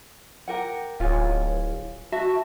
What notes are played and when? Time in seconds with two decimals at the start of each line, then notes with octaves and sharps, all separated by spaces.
0.48 G4 A#4 F#5
1.00 D1 F4 G#4 C#5
2.12 F#4 E5 A5